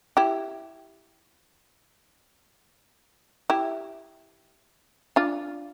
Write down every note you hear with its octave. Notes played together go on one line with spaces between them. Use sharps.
E4 G4
E4 G4
D4 F4